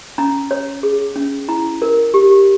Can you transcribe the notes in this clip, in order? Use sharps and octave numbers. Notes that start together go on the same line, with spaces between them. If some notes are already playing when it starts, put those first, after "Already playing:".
C#4 A#5
C#5
G#4
C#4
E4 A#5
A#4
G4